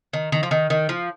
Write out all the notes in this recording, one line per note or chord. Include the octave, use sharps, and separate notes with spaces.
D#3
D#3
F3
D#3
D#3
F3